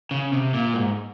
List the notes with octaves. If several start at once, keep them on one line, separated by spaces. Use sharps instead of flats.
C#3
C3
A#2
G#2